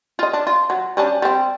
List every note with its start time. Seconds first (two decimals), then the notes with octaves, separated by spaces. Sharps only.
0.19 F4 D#5
0.33 D4
0.47 F4
0.70 F#3
0.97 G3 C#4 D4
1.22 G3 C4